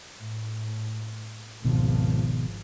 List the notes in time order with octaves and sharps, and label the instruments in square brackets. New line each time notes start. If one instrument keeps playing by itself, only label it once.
[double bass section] A2
[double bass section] G#1 C#2 F3 [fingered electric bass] B2 D#3